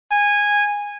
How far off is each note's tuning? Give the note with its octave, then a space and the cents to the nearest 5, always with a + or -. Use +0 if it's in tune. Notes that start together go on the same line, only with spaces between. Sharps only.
G#5 -15